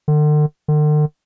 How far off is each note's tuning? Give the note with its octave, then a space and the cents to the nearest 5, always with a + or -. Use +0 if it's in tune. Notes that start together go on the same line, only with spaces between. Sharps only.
D3 +40
D3 +45